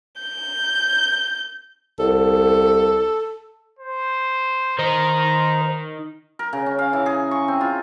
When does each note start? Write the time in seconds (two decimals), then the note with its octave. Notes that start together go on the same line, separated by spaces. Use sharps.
0.21 G6
1.99 C2 A4
3.79 C5
4.79 D#3 D#4 C5 A#5
6.39 A#4
6.53 C#3
6.66 C#4
6.79 F5
6.93 E3
7.06 G#4
7.31 C#6
7.48 C4
7.61 F4